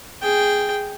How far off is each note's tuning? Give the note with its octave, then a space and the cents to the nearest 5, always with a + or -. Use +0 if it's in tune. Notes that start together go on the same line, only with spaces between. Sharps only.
G#4 +0 G5 +0